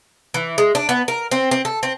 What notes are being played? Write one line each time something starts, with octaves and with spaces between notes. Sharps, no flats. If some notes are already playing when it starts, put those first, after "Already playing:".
E3
G#3
D4
B3
A#4
C4
C4
A4
C4